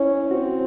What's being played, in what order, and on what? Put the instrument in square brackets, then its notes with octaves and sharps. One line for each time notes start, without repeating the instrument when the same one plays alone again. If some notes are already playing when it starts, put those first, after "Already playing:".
Already playing: [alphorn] C#4 [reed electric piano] E4
[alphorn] C4 [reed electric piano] F#4